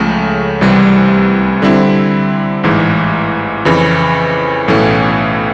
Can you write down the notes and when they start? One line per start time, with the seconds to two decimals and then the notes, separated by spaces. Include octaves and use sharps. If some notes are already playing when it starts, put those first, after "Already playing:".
Already playing: C#2 C#3 F3 A3
0.61 C2 C3 E3 G3
1.62 D3 G3 C4 E4
2.63 A1 G#2 E3
3.65 F2 C#3 E3
4.68 B1 A2 E3 A3 C#4